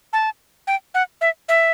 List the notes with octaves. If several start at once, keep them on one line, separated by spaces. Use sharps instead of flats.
A5
G5
F#5
E5
E5